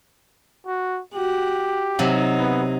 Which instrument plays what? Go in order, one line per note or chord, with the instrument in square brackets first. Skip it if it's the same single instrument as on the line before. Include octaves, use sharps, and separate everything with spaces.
[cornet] F#4
[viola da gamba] F#4 [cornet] G4
[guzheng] C3 F#3 [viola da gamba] D#4
[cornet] B3